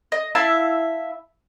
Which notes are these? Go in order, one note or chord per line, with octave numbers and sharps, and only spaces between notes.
D#5
E4 E5 F5 A5